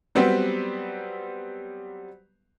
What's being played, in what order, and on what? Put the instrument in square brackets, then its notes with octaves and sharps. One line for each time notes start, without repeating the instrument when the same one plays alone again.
[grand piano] F#3 G3 B3 C4 G4